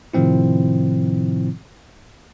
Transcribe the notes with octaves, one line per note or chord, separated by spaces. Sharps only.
A2 C3 D#3 F3 C4 E4